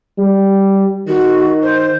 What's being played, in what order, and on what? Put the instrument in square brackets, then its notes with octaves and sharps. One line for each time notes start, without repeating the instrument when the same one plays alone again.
[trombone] G3
[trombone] D#3 [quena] F#4
[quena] C5